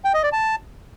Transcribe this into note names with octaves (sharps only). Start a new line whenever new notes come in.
G5
D#5
D5
A5